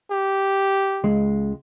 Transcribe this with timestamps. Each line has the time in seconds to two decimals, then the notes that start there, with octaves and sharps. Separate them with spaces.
0.11 G4
1.04 C#2 G#3